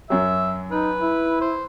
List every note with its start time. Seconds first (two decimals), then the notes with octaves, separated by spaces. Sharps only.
0.10 F#2 F#3 E5
0.71 D#4 B4
1.01 E4
1.41 C5